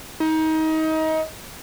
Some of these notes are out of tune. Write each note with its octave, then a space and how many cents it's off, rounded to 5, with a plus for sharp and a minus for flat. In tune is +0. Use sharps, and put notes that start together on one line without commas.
D#4 +25